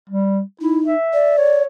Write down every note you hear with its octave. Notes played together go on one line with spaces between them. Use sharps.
G3
D#4 E4
E5
D5
C#5